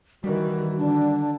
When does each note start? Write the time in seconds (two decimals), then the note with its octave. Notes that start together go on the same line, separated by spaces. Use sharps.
0.24 D#3 E3 G3 F#4
0.78 D3 D4